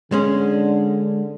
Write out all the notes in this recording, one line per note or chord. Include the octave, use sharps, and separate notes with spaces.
D3 G#3 C#4